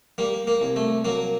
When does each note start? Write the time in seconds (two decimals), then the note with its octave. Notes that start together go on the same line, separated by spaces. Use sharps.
0.18 G3 A#3
0.47 A#3
0.61 C2
0.76 A3
1.05 F#3 A#3